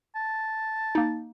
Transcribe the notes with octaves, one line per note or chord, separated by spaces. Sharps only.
A5
A#3 D#4